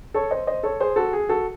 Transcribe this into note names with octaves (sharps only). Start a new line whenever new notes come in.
A4 C#5
C5 D#5
C5 D#5
A4 C#5
G#4 C5
F#4 A4
G#4
F#4 A4